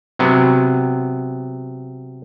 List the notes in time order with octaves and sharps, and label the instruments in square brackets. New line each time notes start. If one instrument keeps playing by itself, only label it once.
[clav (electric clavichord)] C3 F#3 B3